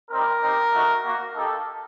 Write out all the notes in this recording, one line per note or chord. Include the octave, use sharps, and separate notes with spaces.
G3 C4 D#4 G4 A#4
C4 D#4 G4
A3 D#4 F#4
A#3 F#4
A#3 D#4 G4 A4